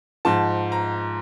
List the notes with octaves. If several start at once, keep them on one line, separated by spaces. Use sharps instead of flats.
G#2 F3 A5
A#5